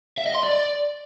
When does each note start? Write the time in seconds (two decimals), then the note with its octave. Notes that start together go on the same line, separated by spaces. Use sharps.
0.18 E5
0.26 D#5
0.35 C6
0.43 D5